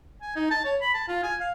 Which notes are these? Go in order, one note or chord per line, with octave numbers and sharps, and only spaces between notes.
G#5
D#4
A5
C#5
B5
A5
F4
G#5
F5